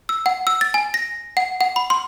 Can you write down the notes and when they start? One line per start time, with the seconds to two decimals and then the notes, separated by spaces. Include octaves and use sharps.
0.09 E6
0.26 F#5
0.47 E6
0.61 A6
0.74 G#5
0.94 A#6
1.37 F#5
1.61 F#5
1.76 B5
1.90 C6